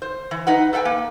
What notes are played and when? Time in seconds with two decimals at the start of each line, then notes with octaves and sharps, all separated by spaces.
0.02 C5
0.31 E3
0.47 D#4 B4 F#5
0.73 A4 B4 F5 G5 G#5
0.85 A#3